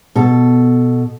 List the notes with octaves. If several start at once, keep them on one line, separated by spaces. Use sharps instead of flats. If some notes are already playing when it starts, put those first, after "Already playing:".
B2 A4